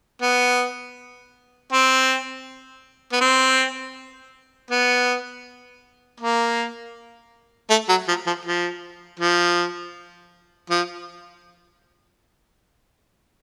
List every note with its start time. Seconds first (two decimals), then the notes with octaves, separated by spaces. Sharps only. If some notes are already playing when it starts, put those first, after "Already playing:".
0.22 B3
1.72 C4
3.12 B3
3.21 C4
4.70 B3
6.20 A#3
7.70 A3
7.89 F#3
8.08 F3
8.27 F3
8.45 F3
9.20 F3
10.70 F3